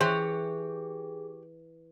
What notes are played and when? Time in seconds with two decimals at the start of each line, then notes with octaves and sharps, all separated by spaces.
0.01 E3 G4 G#4 C5 C#5 F#6